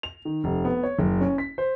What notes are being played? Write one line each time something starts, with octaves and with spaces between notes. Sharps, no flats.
F7
D#3
F1
B3
C#5
F#1
C#4
B6
C5